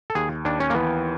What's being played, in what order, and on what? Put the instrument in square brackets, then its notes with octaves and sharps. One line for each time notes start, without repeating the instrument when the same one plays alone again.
[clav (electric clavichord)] A4
[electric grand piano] D#2 [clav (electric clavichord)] G#4
[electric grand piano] D#2 [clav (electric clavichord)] D4
[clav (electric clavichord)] C#4
A#3
[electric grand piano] E3 [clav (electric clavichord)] B3